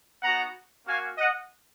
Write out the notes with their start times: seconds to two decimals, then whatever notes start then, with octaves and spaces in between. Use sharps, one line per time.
0.23 B3 D#4 F#4 F#5 A#5
0.86 A#3 C#4 F#4 F5 G#5
1.18 D#5 F#5